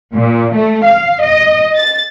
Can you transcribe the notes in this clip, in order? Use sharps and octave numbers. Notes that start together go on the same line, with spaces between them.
A#2
A3
F5
D#5
A6